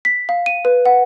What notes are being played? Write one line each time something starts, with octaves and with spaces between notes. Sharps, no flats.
B6
F5
D#7
B4
F#5